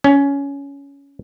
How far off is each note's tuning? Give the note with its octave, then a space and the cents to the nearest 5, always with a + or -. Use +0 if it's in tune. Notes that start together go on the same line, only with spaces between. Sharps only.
C#4 +15